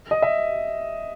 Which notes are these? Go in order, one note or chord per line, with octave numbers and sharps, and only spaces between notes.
D#5
E5